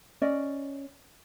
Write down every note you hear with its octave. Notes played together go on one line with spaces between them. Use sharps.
C#4 D5 D#5